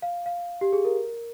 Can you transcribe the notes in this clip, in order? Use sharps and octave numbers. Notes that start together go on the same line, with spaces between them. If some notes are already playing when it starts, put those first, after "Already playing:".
F5
F5
G4
G#4
A#4